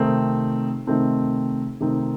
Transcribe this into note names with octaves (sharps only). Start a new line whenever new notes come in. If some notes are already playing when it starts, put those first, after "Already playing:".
Already playing: C3 D#3 A3 C4 D#4
C3 D#3 A3 C4 D#4
C3 D#3 A3 C4 D#4